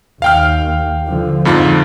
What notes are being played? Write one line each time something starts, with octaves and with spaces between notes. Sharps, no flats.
D#2 F5 G5 F6
D3 F3
F2 G#2 D3 F3 F4